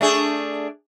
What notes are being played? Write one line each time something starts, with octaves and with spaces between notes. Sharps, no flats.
A3 D4 G#4